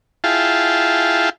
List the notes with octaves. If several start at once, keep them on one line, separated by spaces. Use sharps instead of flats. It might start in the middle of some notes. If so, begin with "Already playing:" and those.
E4 F4 G#4 F5 G5 A5